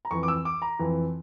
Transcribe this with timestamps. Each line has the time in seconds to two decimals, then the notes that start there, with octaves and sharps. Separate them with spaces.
0.05 A#5
0.11 F2 E3 C#6
0.23 D6
0.28 E6
0.45 D6
0.62 A#5
0.79 F2 E3